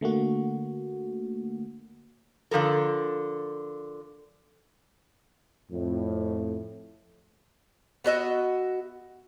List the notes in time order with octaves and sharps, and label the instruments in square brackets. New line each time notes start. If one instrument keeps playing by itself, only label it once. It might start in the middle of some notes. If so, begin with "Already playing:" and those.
[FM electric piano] D3 A3 A#3 F#4
[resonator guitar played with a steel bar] D3 F3 A4 A#4
[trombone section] F2 A2
[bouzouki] B3 F#4 D#5 E5